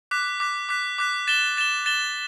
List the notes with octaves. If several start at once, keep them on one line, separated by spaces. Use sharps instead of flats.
D6 F#6 B6
D6 F#6 B6
D6 F#6 B6
D6 F#6 B6
A6 E7 G7
A6 E7 G7
A6 E7 G7